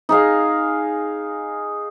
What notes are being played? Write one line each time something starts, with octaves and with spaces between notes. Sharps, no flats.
D#4 G#4 F5